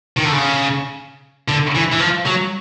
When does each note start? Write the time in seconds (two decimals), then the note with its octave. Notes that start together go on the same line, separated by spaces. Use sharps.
0.17 D#3
0.25 D3
0.31 C#3
1.48 D3
1.75 E3
1.92 E3
2.00 F3
2.26 F#3